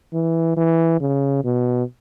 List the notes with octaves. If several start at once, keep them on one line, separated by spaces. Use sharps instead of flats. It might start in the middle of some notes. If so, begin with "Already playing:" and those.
E3
E3
C#3
B2